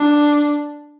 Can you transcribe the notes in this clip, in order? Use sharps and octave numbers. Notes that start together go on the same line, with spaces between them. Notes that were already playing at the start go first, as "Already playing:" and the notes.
Already playing: D4